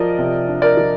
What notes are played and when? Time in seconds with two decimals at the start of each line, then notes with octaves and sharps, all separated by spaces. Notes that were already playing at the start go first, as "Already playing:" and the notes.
Already playing: F3 A#4 D5 D#5
0.18 C3
0.48 D4
0.62 A#4 D5
0.77 F3